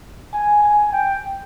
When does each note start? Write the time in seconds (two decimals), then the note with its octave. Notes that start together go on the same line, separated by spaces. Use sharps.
0.33 G#5
0.63 G#5
0.92 G5